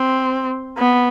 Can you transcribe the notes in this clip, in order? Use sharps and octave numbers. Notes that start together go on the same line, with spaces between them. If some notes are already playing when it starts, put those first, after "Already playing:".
Already playing: C4
B3